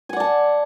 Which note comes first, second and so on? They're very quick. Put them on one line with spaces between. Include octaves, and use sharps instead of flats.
G#5 F#5 D5 A5